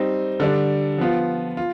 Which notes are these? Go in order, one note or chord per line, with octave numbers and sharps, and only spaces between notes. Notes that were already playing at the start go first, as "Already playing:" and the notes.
Already playing: G3 C4 D#4
D3 G3 D4
F3 B3 F4
F4